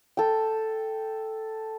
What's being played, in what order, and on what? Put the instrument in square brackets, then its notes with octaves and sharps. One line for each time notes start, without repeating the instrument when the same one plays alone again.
[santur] A4 G5